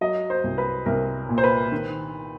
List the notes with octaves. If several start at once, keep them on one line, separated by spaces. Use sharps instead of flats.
F#3 D#5
C5
C2
B4
C2 A#4
A#2
C5
B4
D#3